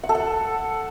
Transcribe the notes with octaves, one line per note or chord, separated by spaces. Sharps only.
F#5
A4
F#5